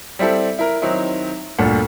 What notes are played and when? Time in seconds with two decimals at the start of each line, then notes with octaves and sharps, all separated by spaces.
0.19 G3 C4 E4 A4
0.59 E4 A#4
0.82 D#3 F#3 C4 D#4 E4
1.58 G1 D2 A#2 A4 F#5